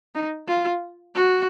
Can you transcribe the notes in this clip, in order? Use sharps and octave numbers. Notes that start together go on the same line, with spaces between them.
D#4
F4
F#4